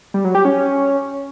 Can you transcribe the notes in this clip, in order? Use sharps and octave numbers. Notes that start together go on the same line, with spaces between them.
G3
F#3
G4
C#4